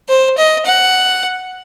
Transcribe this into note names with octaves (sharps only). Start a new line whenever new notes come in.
C5
D#5
F#5